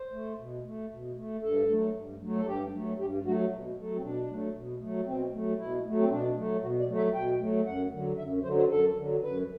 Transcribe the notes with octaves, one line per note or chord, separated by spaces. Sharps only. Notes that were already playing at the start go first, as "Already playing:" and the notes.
Already playing: C5
A3
B2
A3
B2
A3
G2 A4
F#3 A3
G2
F#3 A3
A4
G2 G4
F#3 A3
G2 G4
F#3 A3 F#4
B2
F#3 A3
C4
B2 D4
F#3 A3
B2
F#3 A3
B2 C4
F#3 A3
B2 E4
F#3 A3
C4
B2 D4
F#3 A3
B2 F#4
D5
F#3 A3
E5
B2 G5
F#3 A3
F#2 F#5
D3 F#3
F#2 E5
D3 F#3 C5
C5
F#2 A4
D3 F#3
F#2 B4